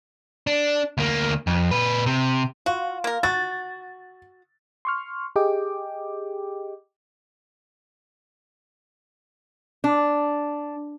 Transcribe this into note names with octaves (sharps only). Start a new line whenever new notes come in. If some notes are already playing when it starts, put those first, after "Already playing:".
D4
D2 A#3
F2
A#2 B4
C3
F4 F#4
A#3 A#4
F#4 A6
C6 C#6 F6
G4 G#4 D#5 G5 D6
D4